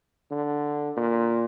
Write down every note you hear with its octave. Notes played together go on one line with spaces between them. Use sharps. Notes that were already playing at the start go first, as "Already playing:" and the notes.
D3
A#2